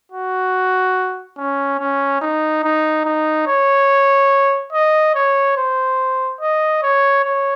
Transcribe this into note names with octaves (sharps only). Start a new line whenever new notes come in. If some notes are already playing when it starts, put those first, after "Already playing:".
F#4
C#4
C#4
D#4
D#4
D#4
C#5
D#5
C#5
C5
D#5
C#5
C#5